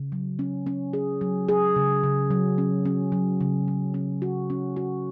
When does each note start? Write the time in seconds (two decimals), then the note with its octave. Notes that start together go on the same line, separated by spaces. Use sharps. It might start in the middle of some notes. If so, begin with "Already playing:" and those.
Already playing: C#3
0.12 F#3
0.39 C#4
0.67 C#4
0.93 G#4
1.21 F#3
1.49 G#4
1.76 C#3
2.03 C#3
2.31 F#3
2.58 C#4
2.86 C#4
3.12 F#3
3.41 C#3
3.68 F#3
3.94 C#4
4.22 F#4
4.50 C#4
4.76 F#4